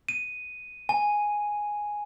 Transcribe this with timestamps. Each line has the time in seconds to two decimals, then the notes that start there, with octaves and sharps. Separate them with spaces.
0.09 D#7
0.89 G#5